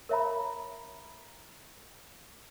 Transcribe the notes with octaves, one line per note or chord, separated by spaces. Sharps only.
A#4 C#5 E5 F5 A#5 B5